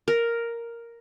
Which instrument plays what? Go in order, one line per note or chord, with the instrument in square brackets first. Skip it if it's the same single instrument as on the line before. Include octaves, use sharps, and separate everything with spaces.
[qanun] A#4